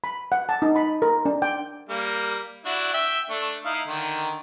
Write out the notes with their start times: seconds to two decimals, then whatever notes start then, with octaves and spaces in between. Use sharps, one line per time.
0.04 B5
0.32 F#5
0.49 A5
0.62 D#4
0.76 B5
1.02 A#4
1.25 D4
1.42 G5
1.89 G3 A#3
2.66 D4 E4 F#4
2.94 E5 G5
3.30 A3 D4
3.65 D#4 E4 F5
3.88 D3 D#3